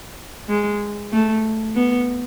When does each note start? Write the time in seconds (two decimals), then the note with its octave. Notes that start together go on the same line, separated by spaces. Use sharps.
0.49 G#3
1.12 A3
1.75 B3